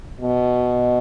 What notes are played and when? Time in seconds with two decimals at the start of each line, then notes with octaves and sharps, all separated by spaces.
0.21 B2